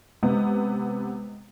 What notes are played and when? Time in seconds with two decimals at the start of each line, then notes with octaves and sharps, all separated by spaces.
0.23 C3 G#3 B3